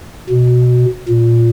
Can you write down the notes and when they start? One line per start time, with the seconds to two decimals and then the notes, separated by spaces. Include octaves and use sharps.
0.30 B2
1.09 A#2